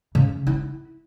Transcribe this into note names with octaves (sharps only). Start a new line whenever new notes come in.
C#3
E4